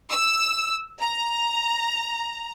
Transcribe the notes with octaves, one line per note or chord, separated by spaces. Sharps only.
E6
A#5